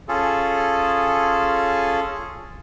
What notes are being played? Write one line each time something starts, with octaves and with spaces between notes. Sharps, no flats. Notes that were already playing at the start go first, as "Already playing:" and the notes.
C#4 F4 G#4 A4